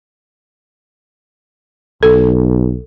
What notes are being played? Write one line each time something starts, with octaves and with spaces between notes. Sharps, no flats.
B1 A4